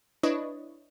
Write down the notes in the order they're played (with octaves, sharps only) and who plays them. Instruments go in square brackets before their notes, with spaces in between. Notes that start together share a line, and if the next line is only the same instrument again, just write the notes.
[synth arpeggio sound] D4 E4 B4 C#5 D#5